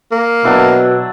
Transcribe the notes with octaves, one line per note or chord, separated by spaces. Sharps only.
A#3
B2 F#3 D4 E4